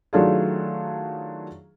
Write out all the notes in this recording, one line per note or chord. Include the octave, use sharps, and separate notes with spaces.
D#3 F#3 A3 D4 F4 G#4